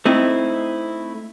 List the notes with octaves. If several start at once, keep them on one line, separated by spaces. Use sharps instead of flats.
A3 C4 D#4 E4